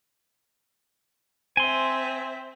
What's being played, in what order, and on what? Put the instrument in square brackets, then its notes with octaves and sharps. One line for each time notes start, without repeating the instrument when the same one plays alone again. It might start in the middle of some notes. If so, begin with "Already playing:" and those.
[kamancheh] C4 E5 [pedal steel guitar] G#5 C6